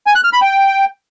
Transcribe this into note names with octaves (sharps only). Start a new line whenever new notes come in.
G#5
F#6
F6
B5
G5